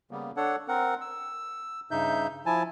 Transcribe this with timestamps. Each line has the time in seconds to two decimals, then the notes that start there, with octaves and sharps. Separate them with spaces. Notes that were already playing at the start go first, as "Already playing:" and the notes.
0.11 C#3 G3 A#3 B3
0.37 D4 A4 C#5 F#5
0.68 C4 A#4 F#5
1.01 E6
1.91 G2 C#3 D#4 E5 G6
2.46 F3 E4 G#5 A5